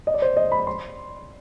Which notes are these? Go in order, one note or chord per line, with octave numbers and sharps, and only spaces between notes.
D#5
D5
C5
D#5
B5
C6